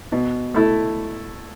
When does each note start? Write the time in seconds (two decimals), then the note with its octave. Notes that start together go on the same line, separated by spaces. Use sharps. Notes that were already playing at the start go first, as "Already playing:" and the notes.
0.12 B2
0.54 A3 E4 A4